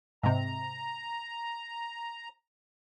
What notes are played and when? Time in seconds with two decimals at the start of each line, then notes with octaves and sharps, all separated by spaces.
0.23 G#2 C3 A#5